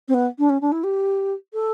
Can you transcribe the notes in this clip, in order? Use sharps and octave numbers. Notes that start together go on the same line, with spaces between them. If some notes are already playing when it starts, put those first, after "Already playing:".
C4
B3
D4
C#4
D4
E4
G4
A4